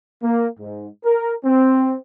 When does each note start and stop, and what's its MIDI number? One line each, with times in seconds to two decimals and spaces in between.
0.23 0.46 58
0.60 0.88 44
1.05 1.34 70
1.44 1.97 60